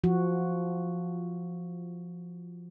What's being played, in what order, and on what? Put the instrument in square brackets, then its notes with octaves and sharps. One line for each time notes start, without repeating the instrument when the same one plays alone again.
[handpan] F3 F#4